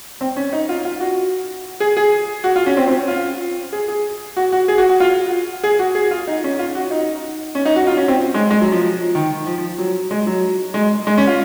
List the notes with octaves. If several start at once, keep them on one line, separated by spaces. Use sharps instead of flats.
C4
C#4
D#4
F4
F4
F#4
G#4
G#4
F#4
F4
C#4
C4
C4
C#4
F4
G#4
G#4
F#4
F#4
G#4
F#4
F#4
F4
G#4
F#4
G#4
F4
D#4
C#4
F4
F#4
D#4
C#4
D#4
F#4
F4
C#4
C4
G#3
G#3
F#3
F3
D#3
F3
F3
F#3
G#3
F#3
G#3
G#3
C#4
F4